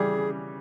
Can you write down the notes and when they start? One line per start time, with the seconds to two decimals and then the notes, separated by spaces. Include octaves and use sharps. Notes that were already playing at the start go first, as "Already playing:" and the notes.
Already playing: C#3 E3 G3 G#4